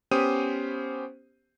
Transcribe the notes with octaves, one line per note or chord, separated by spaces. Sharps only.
B3 C#4 G4 C5 D#6 D#7